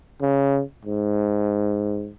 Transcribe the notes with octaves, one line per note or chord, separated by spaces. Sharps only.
C#3
G#2